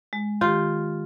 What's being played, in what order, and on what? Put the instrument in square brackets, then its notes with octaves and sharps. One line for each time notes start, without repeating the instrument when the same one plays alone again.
[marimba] G#3
[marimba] D#3 G4 [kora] F4